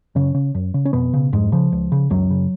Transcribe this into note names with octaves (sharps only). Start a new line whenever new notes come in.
F#2 C#3 C#4
C#3
F#2
C#3
C#4
F2 B2 B3
C#3
F2 G#2 G#3
C#3 F3
C#2
C#3
C#2 F#2 F#3
C#3